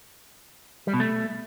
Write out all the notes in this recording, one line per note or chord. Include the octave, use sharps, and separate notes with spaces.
G3
B2
A3